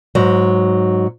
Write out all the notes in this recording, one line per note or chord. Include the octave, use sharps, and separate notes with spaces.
G#2 F#3